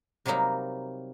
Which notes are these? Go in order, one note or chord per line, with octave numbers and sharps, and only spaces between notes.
C3 F#3 G3 A#3 D#4